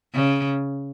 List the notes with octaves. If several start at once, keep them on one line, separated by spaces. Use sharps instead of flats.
C#3